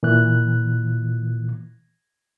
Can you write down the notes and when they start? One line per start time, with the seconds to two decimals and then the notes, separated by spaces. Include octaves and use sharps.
0.03 A#2 E3 F#6